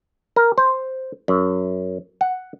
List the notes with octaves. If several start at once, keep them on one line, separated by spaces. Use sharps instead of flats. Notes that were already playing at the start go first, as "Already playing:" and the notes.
A#4
C5
F#2
F#5